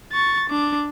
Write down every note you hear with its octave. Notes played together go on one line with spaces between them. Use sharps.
C#6 A6
D4 D6